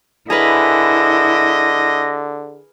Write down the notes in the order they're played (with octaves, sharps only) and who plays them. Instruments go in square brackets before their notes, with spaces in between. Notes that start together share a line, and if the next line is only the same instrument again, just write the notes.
[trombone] D3 [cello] E4 [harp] G#4 A#4 B4 [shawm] D#5